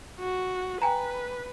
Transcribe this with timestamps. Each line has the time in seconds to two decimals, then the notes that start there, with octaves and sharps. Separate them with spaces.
0.20 F#4
0.82 B4 G5 G#5 A#5